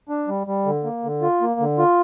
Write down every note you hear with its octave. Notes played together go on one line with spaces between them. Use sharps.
D4
G3
G3
D3
A#3
D3
F4
A#3
D3
F4